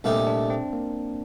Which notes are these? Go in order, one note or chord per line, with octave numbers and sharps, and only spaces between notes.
C2 A#2 A3 D4 D#4 G4
D4
C4
A#3